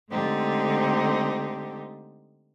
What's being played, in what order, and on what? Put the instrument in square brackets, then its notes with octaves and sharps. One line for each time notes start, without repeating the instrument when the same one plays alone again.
[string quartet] D3 G#3 A3 C4 D#4 G4